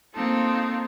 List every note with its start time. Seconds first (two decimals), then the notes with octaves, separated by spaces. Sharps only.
0.14 A#3 C4 D#4 F4 A4